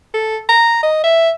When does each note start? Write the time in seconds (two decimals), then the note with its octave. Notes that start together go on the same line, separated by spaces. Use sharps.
0.14 A4
0.49 A#5
0.83 D#5
1.04 E5